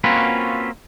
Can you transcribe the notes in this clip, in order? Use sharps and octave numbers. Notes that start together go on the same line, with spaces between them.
A#3 C4 C#4 F4 F#4 B4